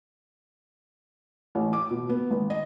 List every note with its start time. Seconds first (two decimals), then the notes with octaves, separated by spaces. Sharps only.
1.55 A1
1.73 D6
1.91 B2
2.09 B3
2.30 G#1
2.50 D#5